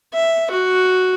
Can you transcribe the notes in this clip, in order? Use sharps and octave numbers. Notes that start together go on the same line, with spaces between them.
E5
F#4